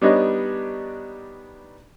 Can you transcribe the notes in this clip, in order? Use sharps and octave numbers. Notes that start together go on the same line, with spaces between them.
G3 B3 D4 D#4 C#5 D#5